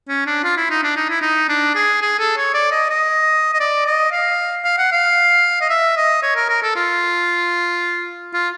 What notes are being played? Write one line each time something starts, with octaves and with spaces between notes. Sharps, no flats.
C#4
D4
F4
E4
D#4
D4
D#4
E4
D#4
D4
G#4
G#4
A4
C#5
D5
D#5
D#5
D#5
D5
D#5
F5
F5
F#5
F5
D#5
E5
D#5
C#5
A#4
A#4
A4
F4
F4